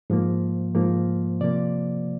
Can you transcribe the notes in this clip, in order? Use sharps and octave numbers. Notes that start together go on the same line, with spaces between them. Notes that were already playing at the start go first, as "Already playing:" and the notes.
G#2 F3 A#3
G#2 F3 A#3
C3 F3 A#3 D5